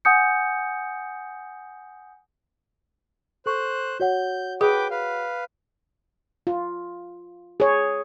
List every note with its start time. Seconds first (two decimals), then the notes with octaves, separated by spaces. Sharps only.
0.05 F#5 G#5 D#6 G6 C#7
3.46 A4 C5 C#6 F#6
4.00 F#4 C#5 F#5 G6
4.61 G#4 B4 G5 D6
4.91 B4 F5
6.47 F4
7.60 G#4 C#5